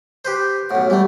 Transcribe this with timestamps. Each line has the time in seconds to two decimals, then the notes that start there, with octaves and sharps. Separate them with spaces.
0.25 G4 B4 C5
0.71 B1 A2 F#5
0.90 E3 G3 A3